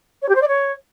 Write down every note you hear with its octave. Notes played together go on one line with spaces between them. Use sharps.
C#5
G4
C5
D5
C#5